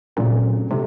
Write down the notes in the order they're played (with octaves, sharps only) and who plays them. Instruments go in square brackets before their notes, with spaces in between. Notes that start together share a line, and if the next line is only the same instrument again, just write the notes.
[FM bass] A#2 [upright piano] C#3 F#3 A3 C4
[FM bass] C3 [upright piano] F#3 A3